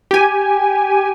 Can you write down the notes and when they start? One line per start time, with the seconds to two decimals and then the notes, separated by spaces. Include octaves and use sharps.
0.11 G4 G#5